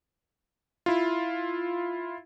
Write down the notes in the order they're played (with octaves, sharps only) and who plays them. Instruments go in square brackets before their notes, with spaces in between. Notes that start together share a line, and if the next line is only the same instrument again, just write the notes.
[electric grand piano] E4 F4